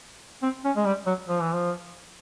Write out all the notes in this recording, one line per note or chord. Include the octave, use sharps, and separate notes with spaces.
C4
C#4
G#3
G3
F#3
F3
E3
F3